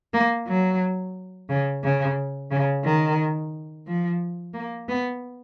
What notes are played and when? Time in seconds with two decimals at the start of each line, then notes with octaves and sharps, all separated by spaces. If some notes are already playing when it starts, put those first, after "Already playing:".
0.13 A#3
0.47 F#3
1.49 C#3
1.84 C#3
2.51 C#3
2.84 D#3
3.87 F3
4.54 A#3
4.88 B3